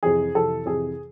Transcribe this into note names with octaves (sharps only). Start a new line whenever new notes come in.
F2 C3 E3 G#4
F2 C3 E3 A4
F2 C3 E3 G#4